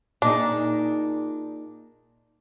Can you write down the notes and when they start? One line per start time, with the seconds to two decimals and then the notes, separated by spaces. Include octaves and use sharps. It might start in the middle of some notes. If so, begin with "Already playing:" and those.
0.22 A#2 D4 D#4 G#4